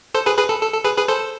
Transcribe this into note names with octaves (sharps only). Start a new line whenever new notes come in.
A4 C5
G#4 B4
G#4 B4
A4
A4
A4
G#4 B4
G#4 B4
A4 C5